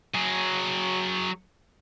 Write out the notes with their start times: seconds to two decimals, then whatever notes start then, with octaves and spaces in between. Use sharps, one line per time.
0.14 F#3 G#4